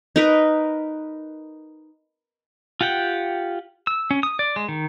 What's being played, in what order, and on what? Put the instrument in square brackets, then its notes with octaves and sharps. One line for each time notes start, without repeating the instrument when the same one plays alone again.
[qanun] D#4 A#4 B4
[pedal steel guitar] F4 G4 F#5 G5
E6
C#4
D#6
D5
G#3
D#3